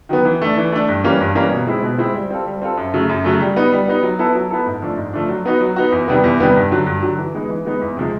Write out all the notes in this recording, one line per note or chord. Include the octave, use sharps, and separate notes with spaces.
D#3 F#3 B3
E3
A3 D4
E3
A3 D4
G2
E3 G3 A#3 C#4
G2
E3 G3 A#3 C#4
B2
G#3 C4 E4
B2
G#3 C4 E4
G3
C4 F4 A4
G3
C4 F4 A4
F#2
C#3 F#3 A3
F#2
C#3 F#3 A3
G3
B3 D#4
G3
B3 D#4
F#3
B3 E4 A4
F#3
B3 E4 A4
G#2
F3 A3 D4
G#2
F3 A3 D4
F#3
B3 D#4 F#4
F#3
B3 D#4 F#4
E2
C3 D#3 G3 B3
E2
C3 D#3 G3 B3
G2
D3 F#3
G2
D3 F#3
E3
G#3 B3 D#4
E3
G#3 B3 D#4
E2
C3 F3 G#3